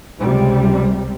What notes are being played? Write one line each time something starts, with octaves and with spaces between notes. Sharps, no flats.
C#2 C3 G3